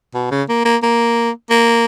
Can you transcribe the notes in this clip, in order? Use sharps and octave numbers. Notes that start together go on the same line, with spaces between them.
B2
C#3
A#3
A#3
A#3
A#3